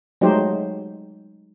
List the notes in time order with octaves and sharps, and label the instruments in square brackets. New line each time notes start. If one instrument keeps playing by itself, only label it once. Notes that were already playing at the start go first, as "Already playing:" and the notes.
[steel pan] F#3 G#3 A3 D#4 G4 C5